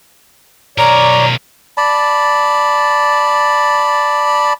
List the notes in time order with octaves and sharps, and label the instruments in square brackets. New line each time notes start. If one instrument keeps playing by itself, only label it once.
[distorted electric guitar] B1 A#4 [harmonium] C#5 D5 [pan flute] A#5
[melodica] D5 A5 B5